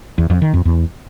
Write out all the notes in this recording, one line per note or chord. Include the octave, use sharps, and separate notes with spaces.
E2
F2
D#3
F2
E2